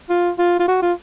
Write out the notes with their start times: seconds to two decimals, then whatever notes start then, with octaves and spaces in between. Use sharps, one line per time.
0.09 F4
0.38 F4
0.59 F4
0.68 F#4
0.82 F4